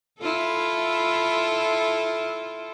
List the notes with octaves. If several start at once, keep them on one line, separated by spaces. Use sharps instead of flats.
E4 F4 A4